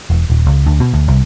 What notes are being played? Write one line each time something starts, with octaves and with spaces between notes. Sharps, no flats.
E1
D#1
C#2
D2
B2
D2
C2